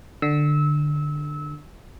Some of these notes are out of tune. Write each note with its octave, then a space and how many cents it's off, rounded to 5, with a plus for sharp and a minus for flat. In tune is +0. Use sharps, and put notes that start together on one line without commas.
D3 +15 E6 -25